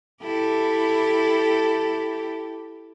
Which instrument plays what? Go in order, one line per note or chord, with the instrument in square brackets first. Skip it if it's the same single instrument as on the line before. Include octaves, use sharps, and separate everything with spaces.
[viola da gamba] E4 G4 A4